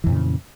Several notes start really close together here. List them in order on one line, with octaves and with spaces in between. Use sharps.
E3 F2 A#2 C#3